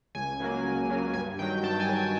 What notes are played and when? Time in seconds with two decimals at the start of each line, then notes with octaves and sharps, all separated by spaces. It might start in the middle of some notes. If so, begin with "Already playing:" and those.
0.15 C#2 G#5
0.40 C#3 F#3 A#3
0.65 C#2
0.90 C#3 F#3 A#3
1.14 G2 G#5
1.39 D#3 G5
1.42 F#3
1.63 G2 A5
1.80 G#5
1.88 D#3 F#3